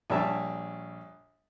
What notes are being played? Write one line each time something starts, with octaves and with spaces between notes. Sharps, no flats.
A#1 G3 A#4 C#5 E5 A5